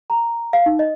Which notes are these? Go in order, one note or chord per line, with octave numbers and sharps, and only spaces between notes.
A#5
F5
D#4
D#5